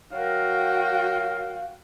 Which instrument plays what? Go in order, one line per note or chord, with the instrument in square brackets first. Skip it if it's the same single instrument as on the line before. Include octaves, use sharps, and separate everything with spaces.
[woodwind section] F#3 A#4 F5 [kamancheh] F#4 G5